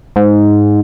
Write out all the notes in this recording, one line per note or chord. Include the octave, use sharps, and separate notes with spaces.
G#2